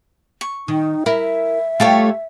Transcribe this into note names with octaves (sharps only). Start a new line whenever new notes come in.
C#6
D#3 D#4
E4 A#4 E5
A3 F4 G4 A4 C#5